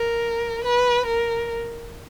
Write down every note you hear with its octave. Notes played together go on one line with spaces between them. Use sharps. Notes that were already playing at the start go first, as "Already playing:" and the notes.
Already playing: A#4
B4
A#4